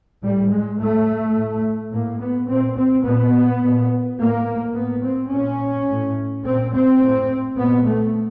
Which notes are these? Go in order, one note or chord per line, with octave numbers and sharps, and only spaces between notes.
A2 G3
G#3
A2 A3
A2
A2 A#3
B3
A#2 C4
C4
A#2 B3
A#2
A2 A#3
A2 B3
C4
A#2 C#4
A2
A#2 C4
C4
A2
A#2 B3
A3